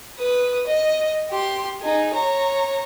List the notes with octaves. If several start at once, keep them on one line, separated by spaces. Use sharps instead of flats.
B4 D#6
D#5
G4 C6
D#4 G#4
C#5 A#5